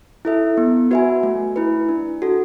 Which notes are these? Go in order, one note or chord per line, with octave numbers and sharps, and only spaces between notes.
E4 A4 E5
B3
F#4 B4 E5 G#5
A3
E4 B4
D4
F#4 A4